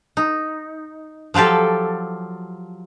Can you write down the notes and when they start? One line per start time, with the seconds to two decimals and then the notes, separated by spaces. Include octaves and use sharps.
0.17 D#4
1.34 F3 F#3 F4 G4 A4